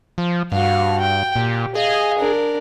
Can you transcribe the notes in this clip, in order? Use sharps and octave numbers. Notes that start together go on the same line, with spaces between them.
F3
G2 F#4 F5
G5
A#2 G4
G#4 D#5 F5
D4 A#4